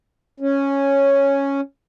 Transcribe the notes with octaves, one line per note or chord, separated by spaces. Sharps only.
C#4